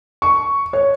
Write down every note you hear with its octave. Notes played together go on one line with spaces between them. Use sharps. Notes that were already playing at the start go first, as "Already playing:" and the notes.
C#6
C#5